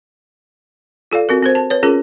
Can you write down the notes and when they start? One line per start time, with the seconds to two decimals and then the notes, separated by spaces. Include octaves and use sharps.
1.12 F4 A4 D5 F5
1.29 C4 F#4 A#4
1.42 C4 A#4 C5
1.55 A5
1.70 B4 C#5
1.83 C#4 F4 G#4 A#4